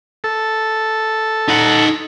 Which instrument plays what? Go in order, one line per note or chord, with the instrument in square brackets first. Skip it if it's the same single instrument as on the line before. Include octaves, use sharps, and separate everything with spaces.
[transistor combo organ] A4
[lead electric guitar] D#4 F#5